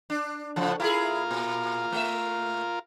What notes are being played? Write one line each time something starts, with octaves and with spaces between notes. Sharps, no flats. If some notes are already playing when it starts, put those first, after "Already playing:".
D4
A2 C#3 F3 A4 F#5
E4 F4 G4 G#4 A#4 F5
A#2
A3 E5